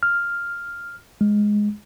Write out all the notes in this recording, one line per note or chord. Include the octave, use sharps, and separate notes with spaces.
F6
G#3